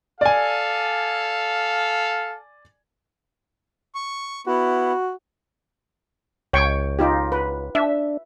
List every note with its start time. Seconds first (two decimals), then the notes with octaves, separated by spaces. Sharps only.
0.21 A4 D5 F5 G#5
3.95 C#6
4.47 B3 E4 F#4
6.53 C#2 C#5 G5 C#6
6.99 D#4 F4 G4
7.32 B4
7.75 D4 E5